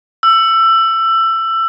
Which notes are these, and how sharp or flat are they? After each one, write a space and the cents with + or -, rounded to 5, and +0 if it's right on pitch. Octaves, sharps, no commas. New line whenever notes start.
E6 +20